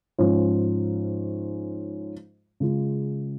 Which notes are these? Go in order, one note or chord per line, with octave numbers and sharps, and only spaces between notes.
G#2 F3 C#4 F4
C#3 G#3 F4